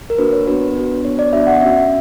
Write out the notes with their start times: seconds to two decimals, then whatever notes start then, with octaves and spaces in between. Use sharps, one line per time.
0.10 A#4
0.18 A#3 D4 F#4 B4
0.33 C#5
0.47 B3 D4 F#4 B4
0.76 B3 D4 F#4
1.05 B3 D4 F#4 C#5
1.19 D5
1.33 B3 D4 F#4 E5
1.47 F#5
1.61 C#4 F#4 E5